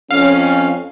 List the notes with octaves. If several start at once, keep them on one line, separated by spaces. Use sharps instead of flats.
F2 C#4 F5